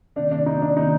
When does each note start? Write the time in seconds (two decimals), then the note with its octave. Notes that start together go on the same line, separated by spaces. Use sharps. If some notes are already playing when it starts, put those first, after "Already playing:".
0.16 C3 D#3 A#3 D4
0.32 D4
0.46 D#4
0.62 D4
0.76 C3 D#3 A#3 D#4